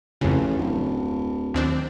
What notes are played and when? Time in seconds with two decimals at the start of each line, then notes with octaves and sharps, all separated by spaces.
0.21 A1 F2 C#3
0.58 D1
1.54 D#2 C4 D4